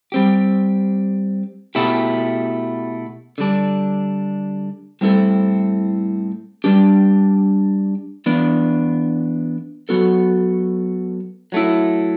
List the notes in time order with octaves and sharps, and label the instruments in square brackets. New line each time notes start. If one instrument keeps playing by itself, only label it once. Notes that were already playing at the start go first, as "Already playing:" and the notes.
[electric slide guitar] G3 C4 G4
B2 A3 E4 G4
D3 G3 D4
A2 G3 C4 E4 A4
G3 D4 G4
E3 B3 D4
F#3 B3 F#4 A4
F#3 A3 E4